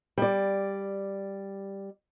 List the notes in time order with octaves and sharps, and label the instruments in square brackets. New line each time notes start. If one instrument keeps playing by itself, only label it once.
[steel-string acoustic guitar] G3 D5